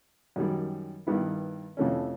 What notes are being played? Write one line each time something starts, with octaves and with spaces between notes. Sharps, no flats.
F#2 D#3 G3
G2 D#3 G3 B3 E4
F2 C3 E3 A3 C#4